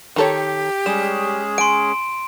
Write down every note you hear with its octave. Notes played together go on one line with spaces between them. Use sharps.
D#3 G4 A4 C#5
G3 G#3 C#4 G#4 E7
G#5 C6 D7